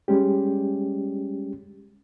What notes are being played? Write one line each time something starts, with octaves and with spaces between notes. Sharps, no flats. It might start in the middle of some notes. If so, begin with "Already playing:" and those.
G3 G#3 C#4 G4